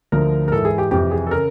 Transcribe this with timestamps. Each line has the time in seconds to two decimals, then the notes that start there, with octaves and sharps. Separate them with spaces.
0.12 D2 D3 F3 A#4
0.48 A#4
0.52 G#2 E3 A4
0.65 G#4
0.78 G4
0.91 F2 C3 E3 G4
1.11 G#4
1.27 A4
1.31 C#3 A#4